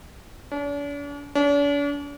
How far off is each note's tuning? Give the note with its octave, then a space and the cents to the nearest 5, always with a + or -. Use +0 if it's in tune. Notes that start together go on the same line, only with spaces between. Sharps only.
D4 -45
D4 -45